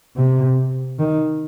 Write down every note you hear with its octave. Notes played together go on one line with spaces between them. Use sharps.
C3
D#3